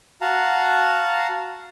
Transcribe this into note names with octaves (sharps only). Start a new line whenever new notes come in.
F#4 F5 F#5 A5 A#5